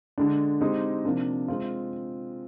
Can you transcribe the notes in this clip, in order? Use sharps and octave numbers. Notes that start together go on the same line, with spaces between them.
D3 G#3 D4
G#3 C4 D#4 G4
C3 F3 A#3 D4
G#3 C4 F4